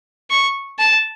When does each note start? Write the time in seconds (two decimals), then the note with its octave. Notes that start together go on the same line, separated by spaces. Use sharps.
0.30 C#6
0.79 A5